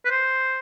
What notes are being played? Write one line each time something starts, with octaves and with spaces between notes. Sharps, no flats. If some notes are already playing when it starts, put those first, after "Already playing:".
B4
C5